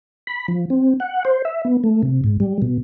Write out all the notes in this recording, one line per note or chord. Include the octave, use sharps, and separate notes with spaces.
B5
F3
C4
F#5
C5
E5
B3
A3
C3
G#2
G3
B2